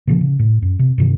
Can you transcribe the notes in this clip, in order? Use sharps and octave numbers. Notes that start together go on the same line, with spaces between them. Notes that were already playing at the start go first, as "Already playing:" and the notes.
A#2 C#3 F3
C#3
A2
F#2
C3
G2 C3 D#3